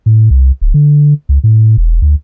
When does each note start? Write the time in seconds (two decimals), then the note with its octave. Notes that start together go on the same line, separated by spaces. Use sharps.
0.06 A2
0.30 C2
0.61 D1
0.74 D3
1.29 C#2
1.44 A2
1.77 E1
2.02 D2